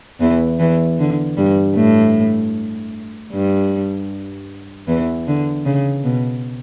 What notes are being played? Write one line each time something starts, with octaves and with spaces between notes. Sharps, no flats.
E2 E3
E2 E3
D3
G2 G3
A2 A3
G2 G3
E2 E3
D3
C#3
B2